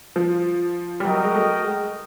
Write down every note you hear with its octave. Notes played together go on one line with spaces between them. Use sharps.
F3
G3
F#3 F#4 A#4 D#5 G5
G#3
A3
G#3